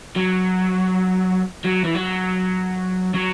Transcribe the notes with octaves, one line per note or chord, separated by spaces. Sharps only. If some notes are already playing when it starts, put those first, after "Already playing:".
F#3
F#3
E3
F#3
F#3